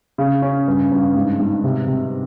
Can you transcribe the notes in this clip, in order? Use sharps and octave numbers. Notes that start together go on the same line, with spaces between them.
C#3
C#4
G2
G2
G#2
G#2
C3
C3